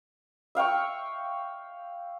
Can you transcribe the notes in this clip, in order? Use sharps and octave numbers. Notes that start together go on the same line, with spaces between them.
E5 F5 G5 C#6